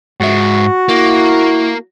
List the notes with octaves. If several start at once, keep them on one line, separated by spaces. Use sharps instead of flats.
G#2 F#4 E5
A#3 E4